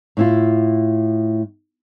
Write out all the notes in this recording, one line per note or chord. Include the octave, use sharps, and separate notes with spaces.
A2 E4 F4